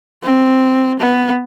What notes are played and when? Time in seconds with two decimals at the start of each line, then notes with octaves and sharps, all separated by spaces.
0.23 C4
0.99 B3